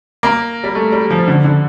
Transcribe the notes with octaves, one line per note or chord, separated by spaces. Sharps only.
A#3
G3
A3
G3
F3
D3
D3